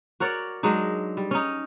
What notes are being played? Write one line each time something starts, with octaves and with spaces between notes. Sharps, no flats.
F#4 A#4 C#5 D5
F#3 G#3 D4 D#4
G3
C#4 D#4